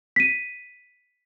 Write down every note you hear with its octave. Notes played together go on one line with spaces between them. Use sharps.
B6 D#7